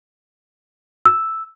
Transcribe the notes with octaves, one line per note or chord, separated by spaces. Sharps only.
E6